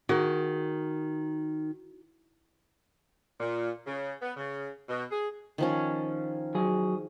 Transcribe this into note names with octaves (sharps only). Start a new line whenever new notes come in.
D#3 F#4 G#4
A#2
C#3
B3
C#3
B2
G#4
D#3 F3 C#4
F#3 G#4